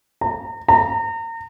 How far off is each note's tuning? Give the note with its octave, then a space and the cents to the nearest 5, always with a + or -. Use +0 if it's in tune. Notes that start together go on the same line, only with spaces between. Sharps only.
A#5 -35
A#5 -35